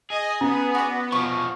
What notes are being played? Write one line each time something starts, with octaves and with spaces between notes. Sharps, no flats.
G#4 D#5
B3 C#4
F#4 D5
B2 F3 C#6